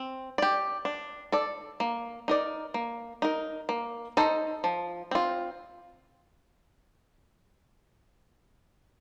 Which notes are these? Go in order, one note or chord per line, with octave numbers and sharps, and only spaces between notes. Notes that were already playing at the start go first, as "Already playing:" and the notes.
Already playing: C4
G4 D5
D4
A4 D5
A#3
D#4 A#4 D5
A#3
D#4 A#4
A#3
D#4 A4 C5 D#5
F3
C4 F4